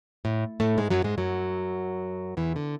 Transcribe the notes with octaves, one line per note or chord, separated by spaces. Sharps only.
A2
A2 A3
G#2 G#3
F#2 F#3
G#2 G#3
F#2 F#3
E2 E3
D3